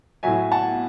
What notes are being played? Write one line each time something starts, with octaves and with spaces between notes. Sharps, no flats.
A2 F#3 E5 G#5
F#5 A5